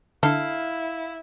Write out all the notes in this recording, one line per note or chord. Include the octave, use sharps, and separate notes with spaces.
D3 D4 E4 A4 F5